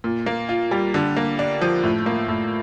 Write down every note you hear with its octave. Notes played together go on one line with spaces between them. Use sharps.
A#2
A#3
F4
G3
D3
A#3
D4
F3
A2
A#3
A2